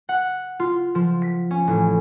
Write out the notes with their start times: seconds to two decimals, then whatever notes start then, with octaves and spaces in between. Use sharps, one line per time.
0.09 F#5
0.60 F4
0.95 F3
1.22 B6
1.51 C#4
1.67 A1